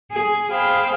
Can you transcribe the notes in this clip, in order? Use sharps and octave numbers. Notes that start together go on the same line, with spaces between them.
G#4
G#4 C5 F5 G5 B5